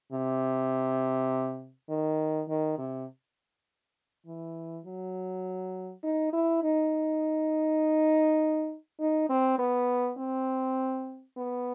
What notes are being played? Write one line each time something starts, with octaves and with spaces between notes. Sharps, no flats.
C3
D#3
D#3
C3
E3
F#3
D#4
E4
D#4
D#4
C4
B3
C4
B3